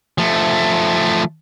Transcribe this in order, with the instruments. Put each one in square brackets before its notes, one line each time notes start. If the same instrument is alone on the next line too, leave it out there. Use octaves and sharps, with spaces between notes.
[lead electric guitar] F3 A3